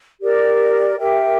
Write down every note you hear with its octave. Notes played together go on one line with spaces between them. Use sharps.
G4 A#4 D5
G4 A#4 E5 G5